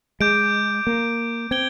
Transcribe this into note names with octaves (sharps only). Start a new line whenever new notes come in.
G#3 D6 G6 D7
A#3
C4 G#6 D7 G7